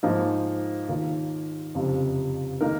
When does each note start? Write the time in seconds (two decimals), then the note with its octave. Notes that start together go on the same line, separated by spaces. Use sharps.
0.03 G#2 F3 A#3 D#4
0.89 D#2 D#3 A#3 F4 A#4
1.75 F#1 F2 C3 F3
2.61 D#3 A#3 D#4 A#4